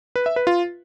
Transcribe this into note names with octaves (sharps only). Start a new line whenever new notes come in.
B4
E5
B4
F4